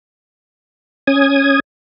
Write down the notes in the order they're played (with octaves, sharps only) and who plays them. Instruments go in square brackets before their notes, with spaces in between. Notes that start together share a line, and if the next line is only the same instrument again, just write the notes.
[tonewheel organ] C#4 D#6 G#6